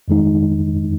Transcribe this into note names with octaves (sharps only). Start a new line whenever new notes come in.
F2 D#3 G#3 D#4